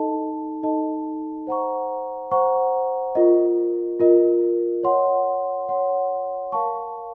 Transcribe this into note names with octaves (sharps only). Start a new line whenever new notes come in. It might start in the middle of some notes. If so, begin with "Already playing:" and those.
Already playing: D#4 A4 D#5 A5
D#4 A4 D#5 A5
C5 F#5 A#5 C#6
C5 F#5 A#5 C#6
F4 A#4 D#5
F4 A#4 D#5
C#5 F#5 C6
C#5 F#5 C6
A#4 F5 A5 C#6